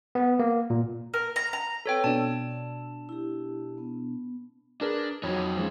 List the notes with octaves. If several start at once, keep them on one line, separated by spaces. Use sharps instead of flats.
B3
A#3
A#2
A#4
A#5
A#5
C4 A4 B4 C#5 G5
B2 D4 A5 E6
E4 G4
B3
D4 G#4 A#4 B4
F2 F#3 D#4 C#5
F3 G#3 C#4